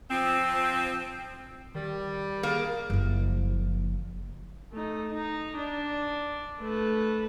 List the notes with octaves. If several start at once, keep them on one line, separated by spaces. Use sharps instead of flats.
F3 C4
D#3 G3
A#3 G#4
F#1 F3
A3 D#4
D#4
D4
A3 B4